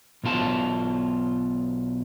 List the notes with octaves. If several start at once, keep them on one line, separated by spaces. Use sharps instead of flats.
B1 B2 F4 A5